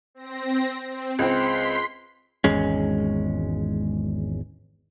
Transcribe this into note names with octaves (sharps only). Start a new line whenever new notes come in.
C4 A#6
C4
C#2 C4 C6 B6 C7
G#1 E2 G#3 C#4